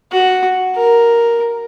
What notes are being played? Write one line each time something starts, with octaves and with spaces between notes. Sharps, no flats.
F#4
A#4